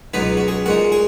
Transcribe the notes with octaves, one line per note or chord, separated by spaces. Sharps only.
C#2 B2 F#3 B3 D#4 B4
F#4
G#4
A#2 G#3 D#4 F#4 F#5
G#4 G#5